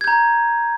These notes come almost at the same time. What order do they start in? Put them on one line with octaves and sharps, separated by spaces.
G#6 G6 A#5